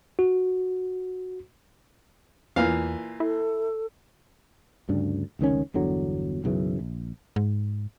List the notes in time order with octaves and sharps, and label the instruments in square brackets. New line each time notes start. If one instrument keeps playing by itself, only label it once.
[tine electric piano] F#4
[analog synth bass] E2 [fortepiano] A#2 E3 F5
[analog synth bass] E4 [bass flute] A4
[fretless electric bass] D2 G2 C#3 D4
F1 C#2 D#3 C#4
G1 E2 D3 F#3
B1 F#2 C#3 E3
A#1
[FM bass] G#2